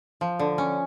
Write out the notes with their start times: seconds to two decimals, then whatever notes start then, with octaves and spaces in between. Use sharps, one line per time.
0.21 F3
0.39 D3
0.58 C#4